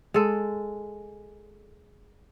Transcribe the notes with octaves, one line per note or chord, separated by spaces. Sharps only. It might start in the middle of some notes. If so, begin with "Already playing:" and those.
G#3 A4